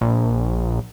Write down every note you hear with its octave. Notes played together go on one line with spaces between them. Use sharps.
A#1